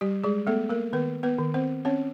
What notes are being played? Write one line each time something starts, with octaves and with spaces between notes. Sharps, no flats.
G3 G4
G#3 G#4
A3 B3 A4
A#3 A#4
D#3 B3 B4
B3 B4
D#3
C4 C5
C4 C#4 C#5